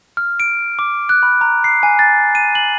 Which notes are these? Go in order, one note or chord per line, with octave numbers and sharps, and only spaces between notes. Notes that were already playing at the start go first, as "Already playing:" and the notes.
F6
D7
D6
F#6
B5
A#5
C7
G#5
A6
D#7
F#7